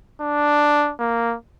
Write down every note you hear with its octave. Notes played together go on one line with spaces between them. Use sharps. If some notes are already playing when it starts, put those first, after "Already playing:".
D4
A#3